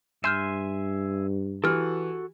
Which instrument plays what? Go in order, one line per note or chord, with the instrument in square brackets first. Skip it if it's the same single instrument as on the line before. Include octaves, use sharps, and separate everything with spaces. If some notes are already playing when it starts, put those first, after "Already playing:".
[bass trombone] G2 [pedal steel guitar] E5 G#5 C6 [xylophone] F6 G6 E7
[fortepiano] E3 [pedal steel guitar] F#4 A4 [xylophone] G4 F6